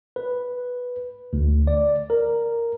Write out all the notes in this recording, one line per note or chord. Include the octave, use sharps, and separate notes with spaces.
B4
D2
D5
A#4